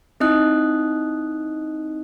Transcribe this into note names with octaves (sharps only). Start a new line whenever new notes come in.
C4 D#4 E4 D#5 D#6 F#6